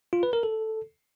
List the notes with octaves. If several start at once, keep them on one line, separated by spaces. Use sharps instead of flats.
F4
B4
A#4
A4